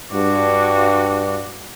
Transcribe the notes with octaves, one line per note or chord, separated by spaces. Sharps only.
G2 F#4 D6